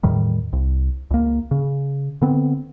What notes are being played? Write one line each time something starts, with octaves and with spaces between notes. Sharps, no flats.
E2 A2 D#3 G3
C2
C#2 A#3
C#3
D3 B3 C4